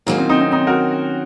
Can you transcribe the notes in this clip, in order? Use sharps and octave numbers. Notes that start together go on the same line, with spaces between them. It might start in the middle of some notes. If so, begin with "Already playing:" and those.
D#3 F#3 A#3 C#4
C4
C4 D#4
C4
C4 D#4
F#4 A#4